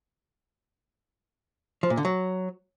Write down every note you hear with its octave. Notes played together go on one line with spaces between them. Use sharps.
F3
A#2
D3
F#3